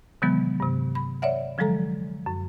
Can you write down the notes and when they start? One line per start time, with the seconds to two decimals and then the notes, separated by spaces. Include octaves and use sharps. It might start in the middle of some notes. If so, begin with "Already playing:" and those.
0.22 C3 D#3 E3 F#3 G#3 B3
0.60 G2 C3
0.95 B5
1.22 C#5 D5 E5 F#5
1.58 D3 F3 F#3 G#3 A4 A#5
2.26 F#2